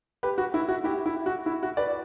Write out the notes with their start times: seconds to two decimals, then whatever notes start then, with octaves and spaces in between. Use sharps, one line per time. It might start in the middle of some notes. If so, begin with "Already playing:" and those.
0.23 G4 B4
0.38 F#4
0.54 E4
0.68 F#4
0.84 E4 G4
1.06 E4
1.26 F#4
1.46 E4
1.63 F#4
1.77 B4 D5